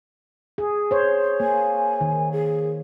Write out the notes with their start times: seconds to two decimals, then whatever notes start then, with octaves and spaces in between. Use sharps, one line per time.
0.58 G#4
0.91 C5 C#5
1.40 A#3 G#5
2.01 D#3
2.32 G#4